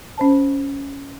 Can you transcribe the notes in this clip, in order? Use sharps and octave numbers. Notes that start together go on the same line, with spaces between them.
C#4 C5 A5